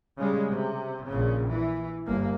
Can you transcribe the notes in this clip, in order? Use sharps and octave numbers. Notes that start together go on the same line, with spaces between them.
C#3 G3 G#3
C3
A#1 C#3
E3
G1 A#3